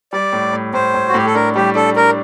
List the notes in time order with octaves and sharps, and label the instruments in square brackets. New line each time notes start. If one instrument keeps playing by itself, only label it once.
[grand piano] G3 [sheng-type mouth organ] D5
[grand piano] A2
A2
[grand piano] A2 [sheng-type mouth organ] C5
[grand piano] A2
[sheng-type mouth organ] F#4
[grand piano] A2 [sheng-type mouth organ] G4
[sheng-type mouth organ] A4
[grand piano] D4 [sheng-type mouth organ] A#4
[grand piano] G3 [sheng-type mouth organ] G4
[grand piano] D4 [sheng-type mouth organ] A4
[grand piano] D4 [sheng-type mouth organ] A#4